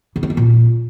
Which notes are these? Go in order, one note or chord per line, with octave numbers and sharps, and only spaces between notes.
C#3
A3
A#3
A#2